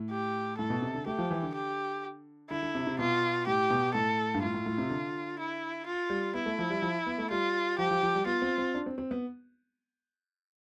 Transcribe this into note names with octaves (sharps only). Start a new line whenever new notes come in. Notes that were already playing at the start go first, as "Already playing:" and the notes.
Already playing: A2
G4
A2 A4
B2
C3
D3
A3 G4
F3
E3
D3
G4
D3 E4
D3
C3
C3
B2 F4
A2 G4
B2
A2 A4
G2
A2 F4
A2
A2
C3
D3
E4
F4
G3
B3 E4
A3
F3
G3
F3
B3
A3
G3 F4
F3 G4
F3
F3
G3
B3 F4
C4
C4
D4
C4
C4
B3